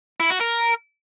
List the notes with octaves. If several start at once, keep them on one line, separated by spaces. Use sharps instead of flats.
E4
F#4
A#4